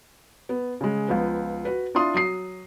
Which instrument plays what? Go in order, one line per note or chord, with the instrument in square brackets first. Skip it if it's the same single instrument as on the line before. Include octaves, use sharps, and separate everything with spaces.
[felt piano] B3
C#3 G#3
C#2 F3 B3
F#4 B4
D4 E4 F4 C6 D#6
F#3 D#6 C7